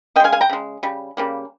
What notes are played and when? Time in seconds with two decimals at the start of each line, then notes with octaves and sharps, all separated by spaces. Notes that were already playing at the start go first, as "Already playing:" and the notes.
0.16 C#3 D#5 G5
0.20 G#3 F5 G#5
0.32 F5 G#5
0.41 G5 A#5
0.49 C#3 G#3
0.83 C#3 G3
1.17 C#3 G3 A#3